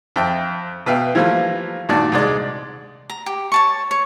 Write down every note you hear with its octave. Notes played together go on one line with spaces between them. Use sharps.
F2 E5 G5
B2 B4 E5 F5 G5
E3 F3 G3 A3 A#3 F4
G2 A#2 D#3 F#4 D5 A5
C2 G#3 D5
A#5
G4
C#5 A5 C#6
C#5